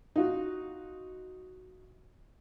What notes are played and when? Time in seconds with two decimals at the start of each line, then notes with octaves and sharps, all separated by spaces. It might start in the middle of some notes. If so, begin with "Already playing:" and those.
0.16 D#4 F4 F#4